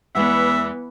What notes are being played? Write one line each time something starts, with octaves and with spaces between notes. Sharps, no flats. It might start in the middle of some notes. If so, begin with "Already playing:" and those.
E2 E3 G#3 B3 E5 F#5